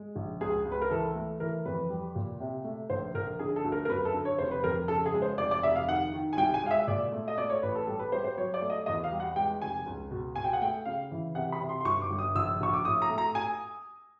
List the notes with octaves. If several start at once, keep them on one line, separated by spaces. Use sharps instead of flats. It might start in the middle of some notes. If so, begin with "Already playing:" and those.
Already playing: G#3
A#1
C#2 G#4
C#2
B4
A#4
E3 A4
A3
E3 A#4
F2 B4
G3
A#2
C3
A3
A#1 C5
A#1 A#4
D3 G#4
A4
D2
A#4
A#4
F#2 B4
A4
D3
C#5
F1 C5
B4
F2 A#4
C#3 A4
G#4
G#3
C5
F1 D5
D5
F1 E5
F5
D#3 F#5
D#3
G#5
C2 G5
G#5
G#3 F5
E5
A#2 D5
A3
D#5
A3 D5
C#5
A1 B4
A4
G3 A4
B4
G3 C5
C5
F#3 C#5
D5
A3
D#5
E2 D#5
F5
G3
F#5
G#3 G5
F1 G#5
C#2
B2
B2 G#5
G5
F#5
A3 G5
C#3 F5
E3
C3 F#5
B5
C3
C6
C6
G1 C#6
D6
G1
D#6
A#1 E6
A#1 C#6
D6
A2 D#6
A#5
A3
A#5
G#5